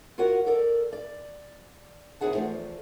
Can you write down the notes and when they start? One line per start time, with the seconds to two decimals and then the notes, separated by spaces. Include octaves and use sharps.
0.18 F4 F#4 A#4 C#5 F#5
0.46 A4 A#4 D5
0.93 D5
2.21 D#2 C3 E4 G#4 F#5 A5
2.34 E2 F3 F#3 A3 C4